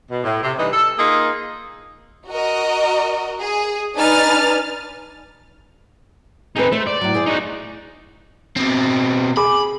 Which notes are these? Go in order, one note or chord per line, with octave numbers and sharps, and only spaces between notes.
B2
A2
C3
E3 G3 D4 D#4
A4
A#3 D#4 F4 G#4
F#4 A#4 D#5
G#4
D4 D#4 B4 G#5 F6 A6
C4 D#4 G#4 B4
A3 C5
D5
A2 F#3
E4 G#4 C5
D#4 F#4
B2 C4
G#4 B5 D6